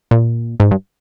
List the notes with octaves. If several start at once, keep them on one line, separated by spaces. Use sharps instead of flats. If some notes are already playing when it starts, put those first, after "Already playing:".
A#2
G#2
G2